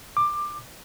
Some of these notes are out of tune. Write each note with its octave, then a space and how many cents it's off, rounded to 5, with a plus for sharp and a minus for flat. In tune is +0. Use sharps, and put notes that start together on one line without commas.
D6 +15